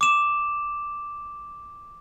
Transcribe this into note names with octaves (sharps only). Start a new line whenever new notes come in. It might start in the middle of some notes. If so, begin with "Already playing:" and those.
D6 E7